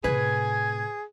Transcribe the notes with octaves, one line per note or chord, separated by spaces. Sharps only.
A2 C3 G#4 B4 G#5